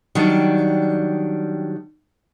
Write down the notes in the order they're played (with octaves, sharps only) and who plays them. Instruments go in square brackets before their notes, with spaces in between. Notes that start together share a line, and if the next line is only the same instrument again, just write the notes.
[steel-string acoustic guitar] D#3 F#3 G3 D4